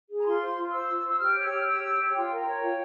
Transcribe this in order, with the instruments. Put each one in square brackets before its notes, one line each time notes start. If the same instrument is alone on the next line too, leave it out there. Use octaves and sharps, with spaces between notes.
[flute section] G#4
A#5
F4 C6
C5
F4
C5 E6
F4
C5
E6
G4 F6
C#5
E6
G4
F6
C#5 E6
G4
C#5
F4 G5
A#4
G5
C#5
F4